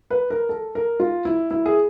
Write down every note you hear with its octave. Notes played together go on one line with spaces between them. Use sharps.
B4
A#4
A4
A#4
F4
E4
E4
G#4